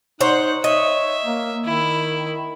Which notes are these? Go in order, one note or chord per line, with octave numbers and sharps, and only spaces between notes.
D#4 C5 C#5 F#5
C#5 D#5 E5
A#3
D#3 E4